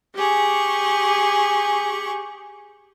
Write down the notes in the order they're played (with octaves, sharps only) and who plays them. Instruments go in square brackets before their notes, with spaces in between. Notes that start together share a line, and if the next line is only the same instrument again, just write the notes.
[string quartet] G4 G#4 C#6